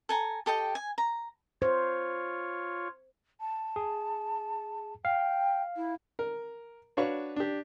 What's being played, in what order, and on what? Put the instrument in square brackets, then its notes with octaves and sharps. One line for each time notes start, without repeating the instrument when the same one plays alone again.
[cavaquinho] A4 G#5 A#5
G4 A4 D#5 G5
G#5
A#5
[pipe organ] F4 C#5 [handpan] C5
[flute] A5
[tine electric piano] G#4
[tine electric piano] F5 [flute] G5
[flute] E4
[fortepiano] A#4
D4 F#4 B4 C#5 F5 C#6
D4 G4